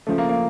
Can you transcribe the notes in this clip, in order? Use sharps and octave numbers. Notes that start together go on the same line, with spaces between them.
C#3 F3 A3
A#3
A#3